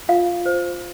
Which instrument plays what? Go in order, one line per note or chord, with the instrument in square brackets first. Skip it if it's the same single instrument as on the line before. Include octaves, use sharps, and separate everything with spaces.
[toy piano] F4 F5
C5